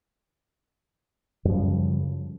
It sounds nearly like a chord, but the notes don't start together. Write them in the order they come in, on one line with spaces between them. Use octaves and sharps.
F#2 F3 G3 C#3